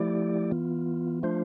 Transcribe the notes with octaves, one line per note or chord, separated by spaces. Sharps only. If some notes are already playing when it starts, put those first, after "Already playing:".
Already playing: F3 A3 E4 G4 D5
E3 B3 F4
F3 A3 D4 F4 C5